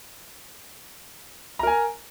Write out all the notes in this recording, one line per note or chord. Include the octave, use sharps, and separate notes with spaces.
A#4 G#5 A#5